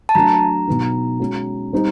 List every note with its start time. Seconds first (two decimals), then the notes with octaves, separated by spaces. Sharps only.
0.09 A5
0.15 F#3 A3 D4 A#5
0.67 B2 F#3 B3 D#4
1.20 G#3 C#4 F#4
1.73 G3 C4 D#4